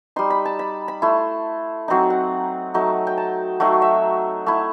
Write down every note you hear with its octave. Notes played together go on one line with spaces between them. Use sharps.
G3 D#4 C6
B5
A5
B5
B5
A3 E4 C6
F#3 C4 D#4
F#5
F#3 A3 D#4
G5
A5
F#3 A3 D#4 G5
E5
A3 E4